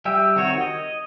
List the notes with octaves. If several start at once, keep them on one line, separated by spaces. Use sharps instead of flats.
G3 E5 G5 E6
D#3 C4 F#4 C#5
D#5